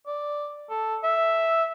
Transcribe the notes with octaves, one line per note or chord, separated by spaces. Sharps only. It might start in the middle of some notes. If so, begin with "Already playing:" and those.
D5
A4
E5